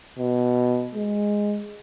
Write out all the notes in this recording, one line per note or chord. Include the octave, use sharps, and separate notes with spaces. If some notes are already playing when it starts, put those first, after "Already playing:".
B2
G#3